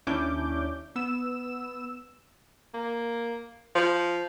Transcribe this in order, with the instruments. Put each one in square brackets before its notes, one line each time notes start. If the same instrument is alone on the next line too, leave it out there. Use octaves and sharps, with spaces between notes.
[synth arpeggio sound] D#2 C#4 D4 E4 D6 G6
B3 E6 E7
[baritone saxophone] A#3
F3